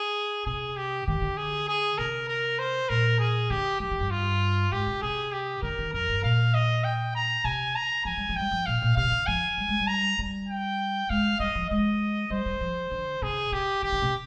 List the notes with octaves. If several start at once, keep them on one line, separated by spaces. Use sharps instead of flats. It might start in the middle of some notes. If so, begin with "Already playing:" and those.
Already playing: G#4
C3 G#4
G4
D#3 G4
D3
G#4
G#4
C3 A#4
A#4
C5
A#2 A#4
G#4
D3 G4
F3 G4
D#3
G2
F4
G#2 G4
C3
C3 G#4
G4
D3 A#4
D#3
F2 A#4
G2
A#2 F5
D#5
G5
A#5
C3 G#5
A#5
F3 G#5
G3
F3
G3 G5
F3
A#2 F5
A#2
C3 F5
D3
F3 G#5
G3
G#3
G3
A#5
G3
G5
G#3 F5
G3 D#5
F3
G#3 D#5
G3 C5
G3
F3
D3
C3 G#4
C3 G4
D#3 G4
D3
C3